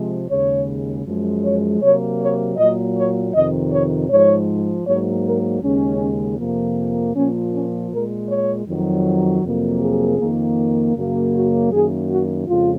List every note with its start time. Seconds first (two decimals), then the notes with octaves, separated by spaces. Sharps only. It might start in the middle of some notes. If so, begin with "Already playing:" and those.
Already playing: C3 F3 G#3
0.28 D#2 C#3 G#3 C#5
1.05 F#2 F3 G#3
1.43 C#5
1.81 C3 F#3 A#3 C#5
2.20 C#5
2.57 A#2 F#3 A#3 D#5
2.96 C#5
3.34 F2 C3 D#3 D#5
3.71 C#5
4.09 G#2 F3 G#3 C#5
4.86 G#2 F#3 A#3 C#5
5.24 A#4
5.62 D#2 C#3 G#3 C#4
6.39 F2 C3 F3 A#3
7.15 A#2 F3 A#3 C#4
7.52 C#4
7.90 A#2 G#3 A#4
8.28 C#5
8.66 F2 D#3 F#3
9.43 F2 C3 F#3 A#3
9.81 G#4
10.19 F2 D#3 A#3
10.95 F#2 C#3 F#3 A#3
11.34 F#4
11.71 F#2 D#3 A#3 G#4
12.10 F#4
12.47 F2 C#3 G#3 F4